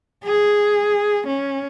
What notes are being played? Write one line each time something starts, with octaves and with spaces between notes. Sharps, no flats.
G#4
C#4